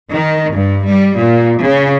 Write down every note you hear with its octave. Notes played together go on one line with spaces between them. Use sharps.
D#3
G2
G3
A#2
C#3